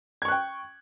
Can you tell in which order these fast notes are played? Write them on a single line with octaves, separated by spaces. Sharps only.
G#6 C#6 F#6 G5